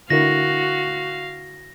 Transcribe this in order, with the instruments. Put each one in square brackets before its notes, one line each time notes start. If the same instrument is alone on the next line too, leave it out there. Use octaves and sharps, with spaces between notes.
[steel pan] D3 E4 A#4 [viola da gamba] F#4 [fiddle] F5 [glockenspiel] A#6